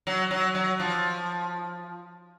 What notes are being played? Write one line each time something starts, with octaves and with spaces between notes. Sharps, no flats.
F#3
F#3
F#3
F3